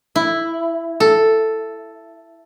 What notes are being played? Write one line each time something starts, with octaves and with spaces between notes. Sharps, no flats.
E4
A4